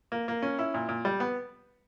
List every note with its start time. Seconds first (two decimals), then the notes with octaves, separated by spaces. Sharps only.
0.12 A#3
0.28 A#3
0.42 C#4
0.59 E4
0.74 A#2
0.89 A#2
1.05 G3
1.20 B3